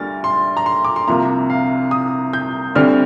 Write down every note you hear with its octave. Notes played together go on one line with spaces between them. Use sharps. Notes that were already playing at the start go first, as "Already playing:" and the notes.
Already playing: D2 D3 G3 A#3 F6 A6
C6
A#5
C6
D6
C6
C2 C3 F3 A#3 A#5
F5
D#6
G6
D2 D3 G3 C4 F6